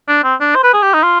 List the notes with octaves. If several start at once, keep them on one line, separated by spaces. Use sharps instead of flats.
D4
C4
D4
C5
B4
G#4
G4
D#4
F4